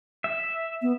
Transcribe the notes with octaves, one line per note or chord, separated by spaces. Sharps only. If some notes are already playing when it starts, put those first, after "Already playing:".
E5
B3